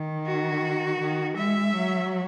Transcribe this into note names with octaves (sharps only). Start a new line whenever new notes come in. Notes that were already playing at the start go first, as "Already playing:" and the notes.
Already playing: D#3
F#4
D#3
G#3 E5
F#3